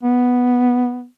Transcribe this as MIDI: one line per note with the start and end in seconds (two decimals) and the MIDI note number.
0.03 1.06 59